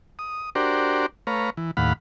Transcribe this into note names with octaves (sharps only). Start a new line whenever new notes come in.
D#6
D4 F#4 G4 A#4 C5 D5
A3 B4 C#5 F5 A#5
E3
D#2 A2 F5 F#5 B5